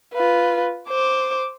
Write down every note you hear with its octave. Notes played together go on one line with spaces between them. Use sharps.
F4 B4
C5 D6